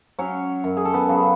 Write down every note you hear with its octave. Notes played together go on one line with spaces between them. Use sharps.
F#3 C#4 C#5
F#2
G#4
A4
B3 B4
C#3 F#3
G#4